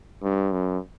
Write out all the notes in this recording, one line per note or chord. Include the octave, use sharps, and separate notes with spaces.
G2
F#2